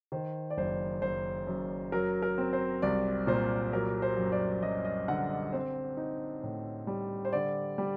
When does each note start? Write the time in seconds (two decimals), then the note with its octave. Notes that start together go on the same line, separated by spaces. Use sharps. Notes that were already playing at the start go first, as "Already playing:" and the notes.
0.12 D#3 C5
0.50 D5
0.57 F#1 C5
1.02 F#1 C5
1.47 F#2
1.92 F#3 A#4
2.22 A#4
2.38 C4
2.53 C5
2.82 C2 D5
3.27 A#2 C5
3.73 F#3 A#4
4.02 C5
4.17 F#2
4.32 D5
4.62 F#2 D#5
4.85 D#5
5.08 D3 F#5
5.30 D#5
5.53 C4 C5
5.97 D#4
6.43 A2
6.87 G3
7.25 C5
7.33 D3 D5
7.78 G3